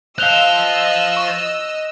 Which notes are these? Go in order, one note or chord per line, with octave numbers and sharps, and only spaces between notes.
C5 D#5 F5 E6 F#6 F7 G7
C#6